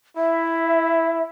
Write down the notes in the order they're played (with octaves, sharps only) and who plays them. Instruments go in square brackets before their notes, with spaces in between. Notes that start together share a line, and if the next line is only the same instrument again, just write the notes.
[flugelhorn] E4 [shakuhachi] E5